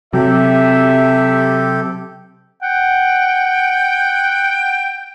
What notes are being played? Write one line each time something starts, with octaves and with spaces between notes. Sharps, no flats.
C3 F#3 G4 A4 E5
F#5 G5